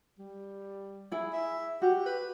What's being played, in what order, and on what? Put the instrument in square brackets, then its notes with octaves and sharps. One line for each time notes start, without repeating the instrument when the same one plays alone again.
[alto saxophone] G3
[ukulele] E4 G#4
[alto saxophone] E5
[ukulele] F#4 [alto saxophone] G4
[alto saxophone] B4